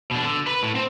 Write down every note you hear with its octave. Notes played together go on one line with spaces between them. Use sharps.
B2 D4
D3
B4 B5
A2
C4